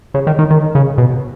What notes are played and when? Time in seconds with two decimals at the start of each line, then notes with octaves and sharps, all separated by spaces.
0.14 C#3
0.27 D#3
0.39 D#3
0.51 D#3
0.75 C#3
0.98 B2